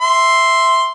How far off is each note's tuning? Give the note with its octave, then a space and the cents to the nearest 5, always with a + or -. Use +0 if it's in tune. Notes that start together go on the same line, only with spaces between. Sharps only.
E5 +5 C6 +0